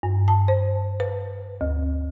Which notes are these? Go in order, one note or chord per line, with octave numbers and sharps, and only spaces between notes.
G2
A5
C5
B4
D2